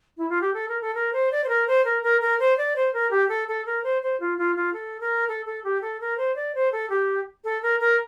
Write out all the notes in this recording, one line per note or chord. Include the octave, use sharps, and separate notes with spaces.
E4
F4
G4
A4
A#4
A4
A#4
C5
D5
C5
A#4
C5
A#4
A#4
A#4
C5
D5
C5
A#4
G4
A4
A4
A#4
C5
C5
F4
F4
F4
A4
A#4
A4
A4
G4
A4
A#4
C5
D5
C5
A4
G4
A4
A#4
A#4